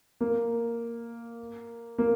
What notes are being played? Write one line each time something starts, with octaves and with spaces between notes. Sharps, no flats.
A#3
A#3